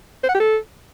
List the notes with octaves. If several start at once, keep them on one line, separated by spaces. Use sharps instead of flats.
C5
F#5
G4
A4